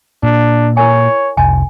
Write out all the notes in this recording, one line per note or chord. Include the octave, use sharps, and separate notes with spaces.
A#2 D4
E4 A#4 C#5 G#5
F1 C2 G#5